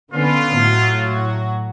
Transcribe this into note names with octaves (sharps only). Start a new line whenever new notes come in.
D3 B3 C#4 F4
A2 F#3 F#4